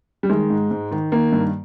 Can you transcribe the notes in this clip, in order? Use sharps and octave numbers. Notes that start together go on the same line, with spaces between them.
G3
D#3 G#3
G#2
G#2
D#3
D#3 A#3
G2